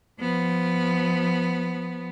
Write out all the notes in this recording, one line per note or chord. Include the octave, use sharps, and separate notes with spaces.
F3 B3